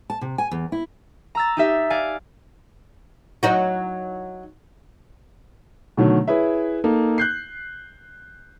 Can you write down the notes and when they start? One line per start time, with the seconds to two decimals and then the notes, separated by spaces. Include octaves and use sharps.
0.10 A5
0.21 C3
0.38 G#5
0.51 E2
0.72 E4
1.35 A#5 E6 A6
1.57 D#4 G4 E5
1.90 D5 F5 G#5
3.43 F#3 D#4 F#4
5.97 B2 D3 D#3 F#3 A3
6.28 E4 G#4 B4 C#5 E5
6.84 A#3 D#4 A4
7.18 F#6 G6 C7